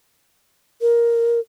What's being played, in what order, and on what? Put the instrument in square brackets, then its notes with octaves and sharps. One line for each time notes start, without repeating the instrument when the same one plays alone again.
[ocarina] A#4